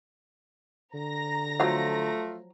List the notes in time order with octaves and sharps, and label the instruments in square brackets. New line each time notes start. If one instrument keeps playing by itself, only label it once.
[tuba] D3 [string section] A#5 A#6
[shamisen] F3 F#3 F5 [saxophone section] A3 F4